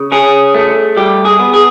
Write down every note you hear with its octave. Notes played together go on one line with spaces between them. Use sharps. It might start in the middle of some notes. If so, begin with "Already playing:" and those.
Already playing: C#3
C#4 G#4
A3
G3 G4
G#4
B3
G#4